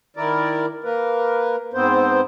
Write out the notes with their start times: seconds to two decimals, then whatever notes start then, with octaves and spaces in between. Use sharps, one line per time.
0.17 D#3 E4 A#4 D5
0.84 A#3 A#4 B4
1.74 G#2 B3 C4 C5